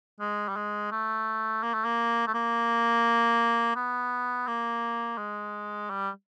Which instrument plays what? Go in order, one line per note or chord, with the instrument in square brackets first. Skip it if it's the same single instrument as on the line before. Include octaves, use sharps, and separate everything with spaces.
[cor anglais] G#3
G3
G#3
A3
A#3
A3
A#3
A3
A#3
B3
A#3
G#3
G3